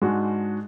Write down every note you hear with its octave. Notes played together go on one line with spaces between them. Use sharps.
G#2 G#3 D4 F#4